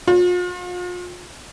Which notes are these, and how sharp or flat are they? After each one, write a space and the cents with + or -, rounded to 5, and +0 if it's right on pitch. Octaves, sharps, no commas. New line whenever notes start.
F4 +40